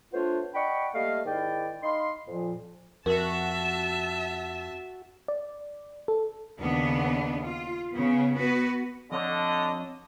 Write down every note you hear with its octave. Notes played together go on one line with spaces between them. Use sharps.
A3 B3 D4 F4 C5 C#5
D5 D#5 F#5 G5 B5 C#6
G3 A3 A#3 D#5 F5
G#2 D#3 E4 D5 G5
D#4 D#5 F5 B5 C6
F2 A#2 F3
F2 F#4 A#4 E5 A5
D5
A4
D#2 C#3 B3 D4
F4
C#3 B3
B3 F#4 B4
F2 D3 C#5 D#5